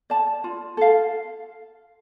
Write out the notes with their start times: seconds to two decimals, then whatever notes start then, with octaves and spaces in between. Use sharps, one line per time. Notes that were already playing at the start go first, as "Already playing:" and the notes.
0.10 D5 A5
0.44 F4
0.77 A4 F5